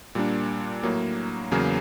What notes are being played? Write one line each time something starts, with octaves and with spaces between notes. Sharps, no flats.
A#2 G3 A#3 D4
A2 F#3 A#3
E2 C#3 F#3 A#3 C#4